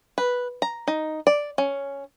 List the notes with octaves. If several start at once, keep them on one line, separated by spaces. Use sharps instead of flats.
B4
A#5
D#4
D5
C#4